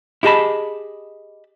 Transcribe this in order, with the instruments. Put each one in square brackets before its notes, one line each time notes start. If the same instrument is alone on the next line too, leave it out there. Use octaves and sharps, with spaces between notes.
[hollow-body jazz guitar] E4 G4 G#4 D#5 A5 B5